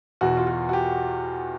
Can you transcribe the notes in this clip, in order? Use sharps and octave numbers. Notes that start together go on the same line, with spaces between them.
E2 B2 F#4
F4
F#4
F#4
G4